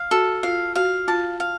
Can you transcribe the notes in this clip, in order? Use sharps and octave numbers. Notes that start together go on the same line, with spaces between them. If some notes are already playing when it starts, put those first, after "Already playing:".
Already playing: F5
F#4 A4
F4 F5
F#4 F5
F4 A5
F5